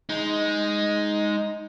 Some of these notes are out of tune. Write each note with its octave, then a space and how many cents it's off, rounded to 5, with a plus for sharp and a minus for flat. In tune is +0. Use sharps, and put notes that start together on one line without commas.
G#3 +0 D#4 +10